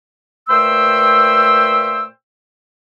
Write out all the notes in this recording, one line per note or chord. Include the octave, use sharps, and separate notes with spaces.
A#2 A3 B4 C5 G5 E6